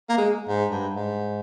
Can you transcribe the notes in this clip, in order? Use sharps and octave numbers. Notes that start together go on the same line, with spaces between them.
A#3
G#3
G#2
G2
G#2